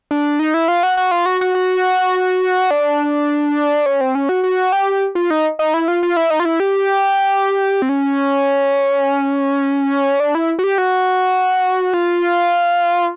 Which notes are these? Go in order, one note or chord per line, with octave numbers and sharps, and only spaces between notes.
D4
D#4
E4
F4
F#4
F#4
F4
F#4
F#4
F#4
D4
C#4
C4
C#4
F#4
F#4
G4
F4
D#4
D#4
E4
F4
F4
E4
D#4
F4
E4
G4
C4
C#4
D4
E4
F#4
G4
F#4
F4